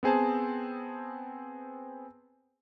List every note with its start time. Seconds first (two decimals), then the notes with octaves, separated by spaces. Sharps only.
0.03 B3 C4 G#4 C5 A5